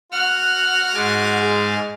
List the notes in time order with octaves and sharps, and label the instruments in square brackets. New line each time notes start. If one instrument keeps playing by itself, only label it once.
[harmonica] F#4 [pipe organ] F#5 [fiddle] F6
[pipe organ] G#2 G#5 D6
[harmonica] G#3